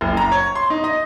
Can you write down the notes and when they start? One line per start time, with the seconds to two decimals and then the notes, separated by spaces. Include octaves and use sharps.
0.01 F#1
0.17 A#5
0.32 C#5
0.55 C6
0.70 D#4
0.84 D#5